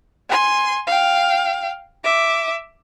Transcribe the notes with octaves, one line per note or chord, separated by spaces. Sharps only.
G#5 C6
F5 G5
E5 D6